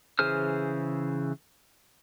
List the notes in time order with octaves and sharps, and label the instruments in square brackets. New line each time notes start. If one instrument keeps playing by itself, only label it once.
[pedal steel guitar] C#3 E3 G#4 C5 F6